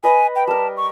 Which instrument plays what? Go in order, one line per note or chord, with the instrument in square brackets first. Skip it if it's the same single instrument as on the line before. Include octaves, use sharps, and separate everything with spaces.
[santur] B4 D#5 [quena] G#5
[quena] G5
[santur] G3 A#4 [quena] A5
[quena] C#6